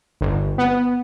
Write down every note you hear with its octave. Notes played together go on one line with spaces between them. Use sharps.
G1
B3